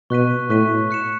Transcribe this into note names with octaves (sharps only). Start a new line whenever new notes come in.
B2 C#6 F#6 B6 D#7
A2 C#6 F#6 B6 D#7
F#6 C#7 E7